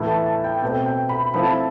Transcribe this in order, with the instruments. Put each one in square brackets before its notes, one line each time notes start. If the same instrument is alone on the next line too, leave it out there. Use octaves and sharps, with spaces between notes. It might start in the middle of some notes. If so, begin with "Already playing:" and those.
Already playing: [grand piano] A2 E3 A3 B5
A5
A5
G5
B2 A3 C4 G5
G5
B5
F3 A3 C4 E4 B5
A5